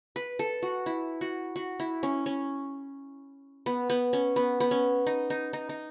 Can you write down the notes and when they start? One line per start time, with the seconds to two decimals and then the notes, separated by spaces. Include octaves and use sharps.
0.16 B4
0.39 A4
0.62 F#4
0.86 E4
1.21 F#4
1.56 F#4
1.80 E4
2.03 C#4
2.26 C#4
3.66 B3
3.90 B3
4.13 C#4
4.36 B3
4.60 B3
4.71 C#4
5.07 D#4
5.30 D#4
5.53 D#4
5.69 D#4